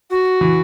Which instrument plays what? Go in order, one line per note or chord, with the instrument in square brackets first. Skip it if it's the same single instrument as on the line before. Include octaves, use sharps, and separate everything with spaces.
[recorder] F#4
[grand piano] E3